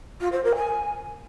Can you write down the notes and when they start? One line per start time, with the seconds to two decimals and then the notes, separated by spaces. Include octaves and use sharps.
0.20 F4
0.32 C5
0.44 A#4
0.55 G#5